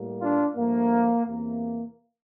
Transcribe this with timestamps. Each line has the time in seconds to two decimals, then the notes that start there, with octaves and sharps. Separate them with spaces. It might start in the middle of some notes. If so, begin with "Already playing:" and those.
Already playing: A2 G3 A#3
0.21 D4 F4
0.56 G2 F3 A3 A#3
1.26 E2 C3 E3 A#3